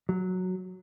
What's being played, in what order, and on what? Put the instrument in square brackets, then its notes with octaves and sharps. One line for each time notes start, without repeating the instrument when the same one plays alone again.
[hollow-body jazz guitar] F#3